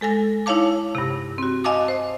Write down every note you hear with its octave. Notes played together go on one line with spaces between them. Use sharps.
G#3 A4 G#5 A#6
D#4 E4 C#5 F5 A5 D6
G2 C3
C4 F#4
D#5 F5 G#5 A5 D6 D#6
C5